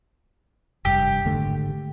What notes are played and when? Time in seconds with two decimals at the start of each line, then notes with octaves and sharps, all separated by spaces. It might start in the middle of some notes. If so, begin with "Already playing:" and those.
0.85 F1 G2 G4
1.25 G#1 D3 A3